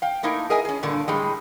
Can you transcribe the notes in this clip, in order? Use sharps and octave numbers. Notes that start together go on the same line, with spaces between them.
F5 G5
A3 A#3 D#4 E4 A#4
G#4 A#4 D#5 E5 G#5
C#4 G#4
G2 A#2 D3 A#3
A2 G3 G#3